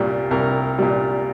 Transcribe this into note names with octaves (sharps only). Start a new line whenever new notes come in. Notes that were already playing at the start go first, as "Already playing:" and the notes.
Already playing: C2 A#2 G3
C2 A#4
A#2 G3